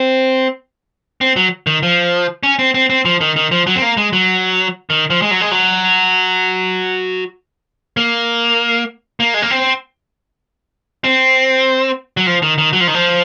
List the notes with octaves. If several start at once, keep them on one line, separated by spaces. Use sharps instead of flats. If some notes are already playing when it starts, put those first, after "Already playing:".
Already playing: C4
C4
F#3
D#3
F3
C#4
C4
C4
C4
F3
D#3
D#3
F3
F#3
C4
A#3
G#3
F#3
D#3
F3
G#3
F#3
G#3
F#3
A#3
A#3
G#3
A#3
C4
C4
F#3
F3
D#3
D#3
F#3
F3
D#3
F3